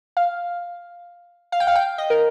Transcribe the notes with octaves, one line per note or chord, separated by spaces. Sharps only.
F5
F5
G5
F5
G5
D#5
A#4